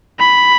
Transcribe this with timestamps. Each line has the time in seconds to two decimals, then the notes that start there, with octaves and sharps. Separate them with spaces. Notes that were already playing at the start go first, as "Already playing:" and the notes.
0.20 B5